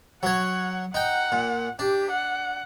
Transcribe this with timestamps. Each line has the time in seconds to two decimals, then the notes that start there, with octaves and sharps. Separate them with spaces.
0.23 F#3 C#5 F#5
0.94 D#4 F#5 G5
1.32 A#2
1.79 D4 G4
2.11 F#5